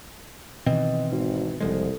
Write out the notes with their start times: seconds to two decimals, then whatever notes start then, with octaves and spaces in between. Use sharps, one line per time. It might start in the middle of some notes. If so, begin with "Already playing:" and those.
0.66 B2 D#3 E3 C4 D#5
1.11 G#1 D#4 F#4
1.60 F#1 C2 F3 G#3 A4